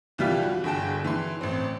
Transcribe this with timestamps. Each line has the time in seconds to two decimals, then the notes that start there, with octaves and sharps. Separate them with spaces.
0.18 C2 E3 G3 F4 G4
0.42 F#4
0.64 G1 D3 G#4 G5 A5
1.05 E3 C6
1.41 A1 C4